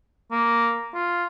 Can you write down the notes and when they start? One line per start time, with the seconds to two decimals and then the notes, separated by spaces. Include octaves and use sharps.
0.31 A#3
0.94 F4